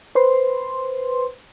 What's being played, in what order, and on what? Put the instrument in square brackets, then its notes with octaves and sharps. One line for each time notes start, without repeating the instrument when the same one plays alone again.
[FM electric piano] B4 C5 C6